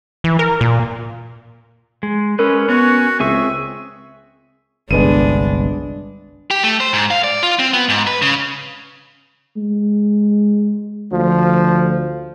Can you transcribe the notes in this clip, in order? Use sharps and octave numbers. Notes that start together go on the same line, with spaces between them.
E3
A#4
A#2
G#3
G#3 C#4 A#4 B4
B3 C#4 F#4 C#5
C#2 C4 G#4 E5 C#6
G1 C2 G#3 B3 D4 D#7
G4
A3
C5
G#2
F5
D5
F4
C4
B3
G#2
B4
C#3
G#3
D2 F3